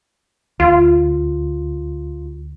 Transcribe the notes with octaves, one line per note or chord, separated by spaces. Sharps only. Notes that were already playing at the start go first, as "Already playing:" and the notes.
D2 F4